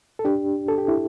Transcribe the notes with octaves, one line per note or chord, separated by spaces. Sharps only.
A4
D4 G4
A4
G4
E4